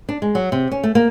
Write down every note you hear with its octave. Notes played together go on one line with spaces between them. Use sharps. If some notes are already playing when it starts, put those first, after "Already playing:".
D4
G#3
F#3
C3
C#4
A3
A#3